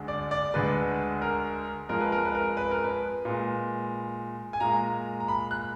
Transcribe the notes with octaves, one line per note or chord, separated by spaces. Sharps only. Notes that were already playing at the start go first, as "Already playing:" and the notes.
Already playing: D2 D3 G#3
D5
D5
D2 D3 G#3 B4
A#4
F2 F3 G#3 A#4
B4
A#4
B4
A#4
B4
A#4
B4
A#2 G#3
G#5
A#2 G#3 A#5
A#5
B5
F#6